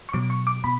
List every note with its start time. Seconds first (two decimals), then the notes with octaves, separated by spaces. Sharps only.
0.09 C#6
0.13 B2 F#3 D6
0.30 C#6
0.47 D6
0.64 B2 B5